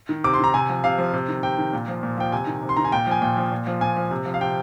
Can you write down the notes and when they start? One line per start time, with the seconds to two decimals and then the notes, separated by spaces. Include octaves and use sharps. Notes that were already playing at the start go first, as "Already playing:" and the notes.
0.09 D#3
0.24 C3 D6
0.34 C6
0.39 D#3 A#5
0.54 C3 G#5
0.69 F3
0.84 C3 F5
0.98 F3
1.13 C3
1.28 D#3
1.43 C3 G5
1.58 D#3
1.73 A#2
1.88 F3
2.03 A#2
2.18 F3 G5
2.32 C3 G#5
2.47 D#3
2.62 C3
2.69 C6
2.76 D#3 A#5
2.85 G#5
2.92 A#2 G5
3.07 F3 G#5
3.22 A#2 G5
3.37 F3
3.52 A#2
3.67 F3
3.81 A#2 G#5
3.97 F3
4.11 C3
4.26 F3
4.34 F5
4.41 C3 G5